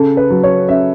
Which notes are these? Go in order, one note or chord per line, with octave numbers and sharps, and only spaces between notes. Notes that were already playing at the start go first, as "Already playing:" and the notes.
Already playing: C#3 A4
B4
F#3
C#5
C#3 E5